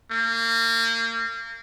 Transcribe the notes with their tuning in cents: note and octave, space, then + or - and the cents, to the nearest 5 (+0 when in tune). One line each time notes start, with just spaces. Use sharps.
A#3 -30